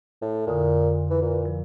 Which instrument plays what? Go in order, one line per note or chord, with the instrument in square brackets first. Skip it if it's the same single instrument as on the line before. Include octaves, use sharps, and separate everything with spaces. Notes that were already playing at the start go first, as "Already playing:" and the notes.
[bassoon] A2
[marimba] F2 D3 D#6 [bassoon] A#2
[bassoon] E3
A#2
[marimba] F3